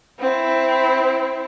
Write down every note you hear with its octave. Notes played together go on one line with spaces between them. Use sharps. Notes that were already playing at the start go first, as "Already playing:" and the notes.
C4 E4